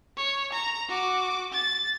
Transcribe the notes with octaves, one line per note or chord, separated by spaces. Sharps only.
C#5
A#5
F#4 D6
A6